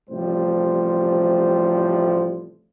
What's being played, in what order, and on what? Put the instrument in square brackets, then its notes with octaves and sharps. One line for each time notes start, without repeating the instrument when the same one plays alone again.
[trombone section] A1 A2 C3 F3 G3 C5